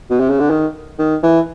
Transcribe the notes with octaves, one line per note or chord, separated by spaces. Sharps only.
B2
C3
C#3
D3
D#3
D#3
E3